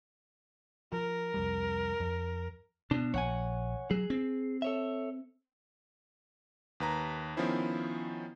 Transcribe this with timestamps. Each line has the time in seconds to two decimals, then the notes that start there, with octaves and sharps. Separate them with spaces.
0.92 F3 A#4
1.34 C2 F2 G3
2.00 F2
2.91 B2 D4
3.14 A#1 C#5 F#5 G#5
3.91 F#3 G#4
4.10 C4
4.62 A4 C#5 E5
6.80 D#2 B4 A#5
7.37 D#3 F3 B3 C#4 E4 C5